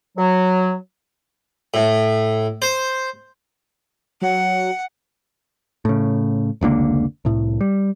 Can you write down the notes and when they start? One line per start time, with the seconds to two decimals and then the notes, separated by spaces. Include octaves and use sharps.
0.17 F#3
1.74 A2
2.62 C5
4.22 F#3 F#5
5.85 A2 C#3
6.61 F1 C#2 D3 A#3
7.25 C2 A2
7.61 G3